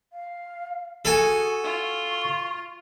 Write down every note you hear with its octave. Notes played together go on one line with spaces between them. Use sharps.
F5
F#4 G#4 A4 G#5
F4 C#6